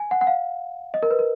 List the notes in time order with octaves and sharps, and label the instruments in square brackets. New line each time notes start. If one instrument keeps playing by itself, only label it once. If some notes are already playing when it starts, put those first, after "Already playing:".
Already playing: [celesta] G#5
F#5
F#5
F5
D#5
A#4
B4
A#4